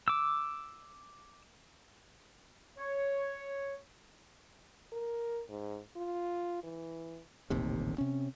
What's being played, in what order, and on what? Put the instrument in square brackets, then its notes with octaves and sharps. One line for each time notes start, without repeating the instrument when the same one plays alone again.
[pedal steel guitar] D6 E6
[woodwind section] C#5
[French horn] A#4
G#2
F4
E3
[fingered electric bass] D#1 A1 D#2 C3
C3 C#4